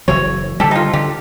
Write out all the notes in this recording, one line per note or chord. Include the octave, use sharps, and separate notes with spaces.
F#1 E3 F#3 C#5
D3 G3 G4 A4
D#4 F4
D3 G4